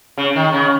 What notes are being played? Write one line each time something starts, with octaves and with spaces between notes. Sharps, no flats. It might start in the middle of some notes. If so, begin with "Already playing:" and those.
C#3
D#3
C#3